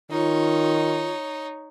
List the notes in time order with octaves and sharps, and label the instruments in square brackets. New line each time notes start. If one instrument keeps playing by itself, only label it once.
[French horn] D#3 [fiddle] D#4 C#5 [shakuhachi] F4